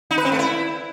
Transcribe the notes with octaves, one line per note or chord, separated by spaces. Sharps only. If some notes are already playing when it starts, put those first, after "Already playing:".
D#4
B4
C4
A3
E4